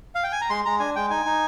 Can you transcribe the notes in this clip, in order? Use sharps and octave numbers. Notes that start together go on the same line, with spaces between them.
F5
G5
G#5
A#5
G#3 C6
G#3 A#5
D4 G#5
G#3 G5
D#4 G#5
D#4